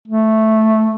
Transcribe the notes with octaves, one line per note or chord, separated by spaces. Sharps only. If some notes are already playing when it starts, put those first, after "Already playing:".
A3